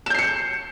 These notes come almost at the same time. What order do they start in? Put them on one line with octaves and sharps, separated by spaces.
E7 G6 C7 C#7